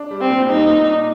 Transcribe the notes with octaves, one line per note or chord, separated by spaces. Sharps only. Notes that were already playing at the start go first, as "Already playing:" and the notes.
Already playing: D4
G3
C4
A#2
G3 D#4
A#2
D4